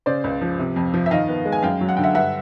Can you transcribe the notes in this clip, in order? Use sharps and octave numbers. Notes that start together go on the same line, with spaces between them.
C#3 C5 D5
C#2
F3
C3
F2
F3
E5
D#3 D#5 F5
B3
G#3
G#5
F#2 F5 G5
F#3
F#5
D3 G5
E5 F#5
G2 E5 F#5